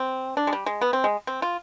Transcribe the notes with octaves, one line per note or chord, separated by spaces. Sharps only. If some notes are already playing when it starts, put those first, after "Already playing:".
Already playing: C4
D4
G#3
G3
G#3
B3
C4
G#3
C4
F4